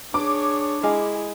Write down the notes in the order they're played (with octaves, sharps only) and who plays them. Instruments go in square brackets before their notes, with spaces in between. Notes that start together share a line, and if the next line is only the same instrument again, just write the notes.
[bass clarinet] D4 [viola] G#4 C#5 [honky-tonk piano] D6
[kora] G#3 F5 [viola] E4 G#4